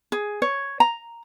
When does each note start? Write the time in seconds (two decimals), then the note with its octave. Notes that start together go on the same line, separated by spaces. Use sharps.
0.12 G#4
0.42 C#5
0.80 A#5